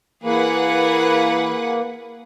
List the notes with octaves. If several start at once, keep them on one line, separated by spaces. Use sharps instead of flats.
E3 A#3 G#4 B4 F#5